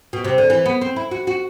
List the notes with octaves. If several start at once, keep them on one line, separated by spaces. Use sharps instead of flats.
B2
C3
D3
E3
B3
C4
E4
F#4
F#4